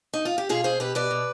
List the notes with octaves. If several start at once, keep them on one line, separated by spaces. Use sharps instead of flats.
D#4
F4
G4
B2 F4 G#4
B2 G#4 C5
B2 G4 B4
B2 B4 D5
B2